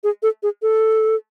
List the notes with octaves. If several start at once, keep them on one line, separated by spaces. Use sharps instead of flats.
G#4
A4
G#4
A4